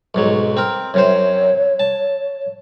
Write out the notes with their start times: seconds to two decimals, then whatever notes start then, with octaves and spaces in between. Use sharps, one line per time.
0.15 B1 G#2 F#3
0.57 C4 A#4
0.94 F#2 C3 C5 C#5
1.80 A5